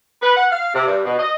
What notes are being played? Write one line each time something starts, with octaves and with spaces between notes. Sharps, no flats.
B4
F#5
F5
C3
G2
B2
D#5